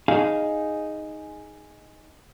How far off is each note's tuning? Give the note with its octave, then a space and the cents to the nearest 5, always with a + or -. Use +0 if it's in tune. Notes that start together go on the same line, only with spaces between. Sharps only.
D#4 +0 G#4 +0 F5 +0